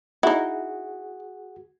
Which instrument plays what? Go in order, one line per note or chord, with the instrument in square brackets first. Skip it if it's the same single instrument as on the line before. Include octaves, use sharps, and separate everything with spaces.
[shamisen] D#4 E4 [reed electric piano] F#4 G#4 F#5